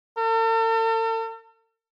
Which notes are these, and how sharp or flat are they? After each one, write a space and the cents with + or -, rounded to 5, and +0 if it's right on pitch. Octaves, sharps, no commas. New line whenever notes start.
A4 +45